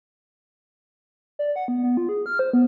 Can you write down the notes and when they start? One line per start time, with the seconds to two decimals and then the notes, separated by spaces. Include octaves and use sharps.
1.39 D5
1.56 F#5
1.68 B3
1.83 B3
1.97 F4
2.09 G#4
2.26 F6
2.39 C5
2.53 B3